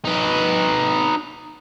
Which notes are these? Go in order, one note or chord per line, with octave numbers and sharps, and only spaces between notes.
D#4 B4